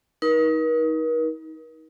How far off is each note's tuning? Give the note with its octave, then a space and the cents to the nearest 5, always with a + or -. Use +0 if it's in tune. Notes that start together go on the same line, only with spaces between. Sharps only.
D#4 +25 A#4 +45